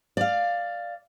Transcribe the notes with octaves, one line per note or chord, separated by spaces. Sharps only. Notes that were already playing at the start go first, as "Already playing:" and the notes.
D5 F5